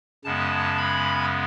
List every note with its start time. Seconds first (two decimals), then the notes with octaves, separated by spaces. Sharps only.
0.24 F#2 C#3 G#3 B3 A5
0.77 B5